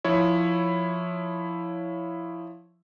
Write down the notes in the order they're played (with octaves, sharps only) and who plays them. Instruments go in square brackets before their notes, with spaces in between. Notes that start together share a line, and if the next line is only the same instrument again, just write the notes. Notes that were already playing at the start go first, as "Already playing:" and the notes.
[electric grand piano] F3 E4 C#5